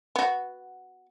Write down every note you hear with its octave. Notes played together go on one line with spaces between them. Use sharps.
B3 F#4